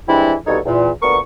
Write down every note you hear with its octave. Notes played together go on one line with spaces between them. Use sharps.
E3 G3 G#3 C4 D4 E4
C2 G2 B2 D#4 A4 C#5
E2 A#2
D2 A#2 B3 A#4 C#6